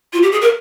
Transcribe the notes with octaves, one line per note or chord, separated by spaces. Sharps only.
F4
G4
G#4
A#4